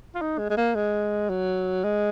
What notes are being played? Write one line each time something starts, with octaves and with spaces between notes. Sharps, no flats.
F4
D#4
G#3
G#3
A#3
G#3
F#3
G#3